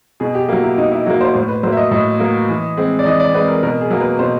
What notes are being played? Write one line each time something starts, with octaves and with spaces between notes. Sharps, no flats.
B2 G#4
G4
F#3 A#3 F#4
E4
B2 D#4
E4
F#3 A#3 F#4
C5
A2 C5
B4
F#3 A#3 C5
E5
D#5
A2 D#5
F#3 A#3
E3
G#3 C4
D5
E3 D#5
D5
G#3 C4 B4
A#4
B2 A#4
G#4
F#3 A#3
B4
B2 C5